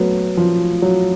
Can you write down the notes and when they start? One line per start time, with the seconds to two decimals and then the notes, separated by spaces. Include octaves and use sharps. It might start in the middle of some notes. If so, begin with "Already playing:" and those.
Already playing: F#3 A3 B3
0.37 F3
0.82 F#3